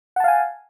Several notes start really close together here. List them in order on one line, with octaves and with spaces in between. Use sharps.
F#5 A5 F5 G#5